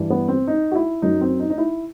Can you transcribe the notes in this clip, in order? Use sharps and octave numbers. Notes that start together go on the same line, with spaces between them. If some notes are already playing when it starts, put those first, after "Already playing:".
Already playing: G2 E3 G3
B3
C4
D#4
F#4
E4
F#2 F#3 D#4
C4
D#4
D#4
E4